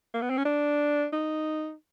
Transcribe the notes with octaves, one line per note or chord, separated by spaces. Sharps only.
A#3
B3
C4
C#4
D4
D#4